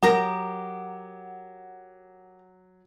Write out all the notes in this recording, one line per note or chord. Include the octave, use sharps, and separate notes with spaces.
F#3 G4 A#4 F#5 A#5